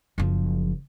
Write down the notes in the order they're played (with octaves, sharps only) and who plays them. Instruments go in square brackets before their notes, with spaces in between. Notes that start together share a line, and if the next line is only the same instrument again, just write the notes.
[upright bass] F#1 F3